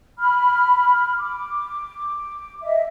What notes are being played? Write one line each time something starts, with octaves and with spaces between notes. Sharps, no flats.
B5 F6
D6
D#5 E5